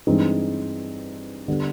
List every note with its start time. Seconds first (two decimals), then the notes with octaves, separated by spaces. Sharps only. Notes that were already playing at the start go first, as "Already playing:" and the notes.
0.07 G2 E3 G#3 C4 D#4
1.48 D3 G3 B3